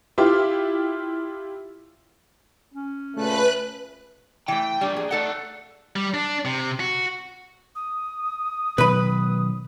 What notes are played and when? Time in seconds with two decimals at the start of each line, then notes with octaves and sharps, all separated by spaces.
0.18 E4 F4 G4
2.74 C#4
3.16 A#2 C#3 A3 B4 F#6
4.48 E3 A3 G5
4.81 G3 A#3 D4
4.97 G#4
5.11 A3 D#4 A4 D5 F#5
5.96 G3
6.14 D4
6.45 C3
6.80 F#4
7.75 D#6
8.78 B2 D#3 F#3 B4 B5